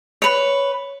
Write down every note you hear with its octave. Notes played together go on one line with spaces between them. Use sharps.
B4 C#5